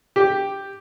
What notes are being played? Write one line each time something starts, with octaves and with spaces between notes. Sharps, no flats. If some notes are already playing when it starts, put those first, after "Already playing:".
G4